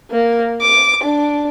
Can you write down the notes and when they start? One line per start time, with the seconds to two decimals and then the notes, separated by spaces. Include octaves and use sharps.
0.10 A#3
0.61 D6
1.04 D4